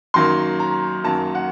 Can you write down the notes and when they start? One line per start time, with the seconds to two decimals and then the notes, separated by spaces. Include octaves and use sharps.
0.14 F#2 D#3 F#3 A#3 C6
0.60 A#5
1.04 F#2 D#3 F#3 A#3 A5
1.35 F#5